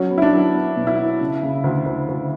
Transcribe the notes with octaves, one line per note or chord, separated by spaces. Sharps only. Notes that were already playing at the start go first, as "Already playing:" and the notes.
Already playing: F#3 C#4
B3
E4
D4
F#3
B3
B2
E4
B3
C#3
C#3
D2
D2
D2